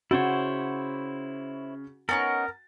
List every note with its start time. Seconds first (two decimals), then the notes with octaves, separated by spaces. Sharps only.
0.11 C#3 E4 F#4 C5 C#5 A6
2.09 B3 C#4 D#4 A#4 F#5 G#5 A6